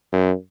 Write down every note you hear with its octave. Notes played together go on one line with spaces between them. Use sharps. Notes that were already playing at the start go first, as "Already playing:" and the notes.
F#2